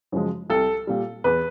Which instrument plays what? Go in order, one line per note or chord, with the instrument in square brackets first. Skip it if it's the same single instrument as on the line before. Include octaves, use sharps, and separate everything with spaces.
[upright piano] F#2 C#3 F3 G#3
C2 A4
A#2 G3
E2 B4